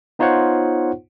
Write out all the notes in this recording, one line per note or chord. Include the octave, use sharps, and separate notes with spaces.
B3 D#4 F4 C5 C#5 F#5